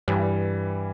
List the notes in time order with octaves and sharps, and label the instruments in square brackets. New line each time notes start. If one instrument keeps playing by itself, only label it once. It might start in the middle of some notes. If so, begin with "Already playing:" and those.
[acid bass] G2 [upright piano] E3 G3